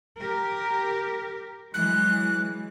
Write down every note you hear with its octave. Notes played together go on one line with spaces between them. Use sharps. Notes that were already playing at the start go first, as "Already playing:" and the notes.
G4 A#4
E3 F#3 G#3 F#6